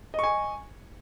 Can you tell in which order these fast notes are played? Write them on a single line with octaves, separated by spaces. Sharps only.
D#5 C#6 G#5